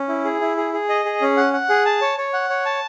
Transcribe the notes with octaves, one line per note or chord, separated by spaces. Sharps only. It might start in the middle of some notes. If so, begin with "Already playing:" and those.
Already playing: C#4
E4
G#4
E4
G#4
G#4
D#5
G#4
C#4
F#5
F#5
G#4
A5
C#5
C#5
F#5
C#5
A5